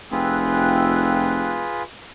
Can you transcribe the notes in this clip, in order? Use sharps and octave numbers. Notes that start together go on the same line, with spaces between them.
F1 F4 G#4 B4 G5 E6 F#6